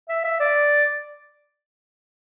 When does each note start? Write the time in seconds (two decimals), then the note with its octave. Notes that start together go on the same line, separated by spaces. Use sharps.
0.09 E5
0.24 E5
0.40 D5